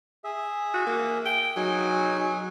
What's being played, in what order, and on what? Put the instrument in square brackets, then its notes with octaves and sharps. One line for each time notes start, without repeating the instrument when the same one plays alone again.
[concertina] G#4 E5
[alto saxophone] F#4
A#3
G5
[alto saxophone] F#3 [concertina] D#4 G#4 G#5